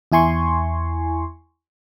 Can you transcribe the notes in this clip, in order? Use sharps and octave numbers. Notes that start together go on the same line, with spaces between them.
E2 E4 G#5 C6 C#6